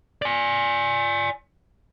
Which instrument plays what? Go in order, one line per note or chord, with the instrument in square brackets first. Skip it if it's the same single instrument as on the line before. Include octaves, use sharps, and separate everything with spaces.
[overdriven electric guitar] D5 G#5